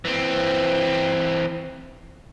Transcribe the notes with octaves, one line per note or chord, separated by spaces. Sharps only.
E3 C4